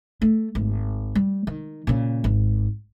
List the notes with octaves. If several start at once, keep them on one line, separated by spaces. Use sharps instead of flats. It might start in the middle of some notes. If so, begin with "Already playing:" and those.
A3
G#1
G3
D#3
A#2 C#3
G#1